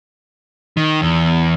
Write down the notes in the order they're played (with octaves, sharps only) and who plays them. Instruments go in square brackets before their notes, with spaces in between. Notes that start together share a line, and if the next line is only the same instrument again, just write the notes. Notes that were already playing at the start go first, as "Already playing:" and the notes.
[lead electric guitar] D#3
E2